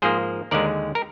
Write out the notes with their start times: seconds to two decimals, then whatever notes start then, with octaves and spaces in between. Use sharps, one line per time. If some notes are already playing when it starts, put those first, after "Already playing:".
0.02 G#2 F3 A#3 G#4 C5
0.51 D#2 D3 G#3 A#4 D5
0.95 A#4